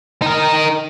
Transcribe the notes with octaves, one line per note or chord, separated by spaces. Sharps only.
D#4 A#4